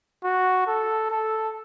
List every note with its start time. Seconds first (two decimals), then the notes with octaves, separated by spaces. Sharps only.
0.24 F#4
0.67 A4
1.10 A4